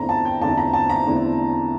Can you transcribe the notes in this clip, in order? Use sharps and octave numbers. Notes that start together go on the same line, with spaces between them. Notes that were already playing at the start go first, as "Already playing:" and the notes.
Already playing: E2 D3 A3 C4 E4 A#5
A5
G5
E2 D3 A3 C4 E4 A5
A#5
A5
A#5
E2 D3 A3 C4 E4